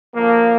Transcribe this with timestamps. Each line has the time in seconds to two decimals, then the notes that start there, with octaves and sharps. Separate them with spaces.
0.15 D3 F3 A#3